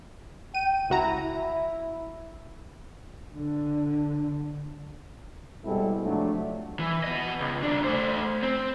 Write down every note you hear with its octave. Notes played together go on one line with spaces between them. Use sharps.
G5 D#7
C#2 E4 F#4 A#5
E4
D3
B2 G3 G#3 C4 E4 A4
G#2 C3 F3 F#3 A3 D4
E3
B3 D#5
C#2
C2 D4
A3 C5
C4